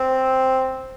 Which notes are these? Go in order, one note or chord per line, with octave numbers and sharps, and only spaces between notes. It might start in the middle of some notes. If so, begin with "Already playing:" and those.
Already playing: C4